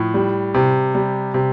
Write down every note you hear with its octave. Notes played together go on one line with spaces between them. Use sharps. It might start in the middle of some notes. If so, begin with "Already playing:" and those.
Already playing: A2 F3
G3
C3
G3
C3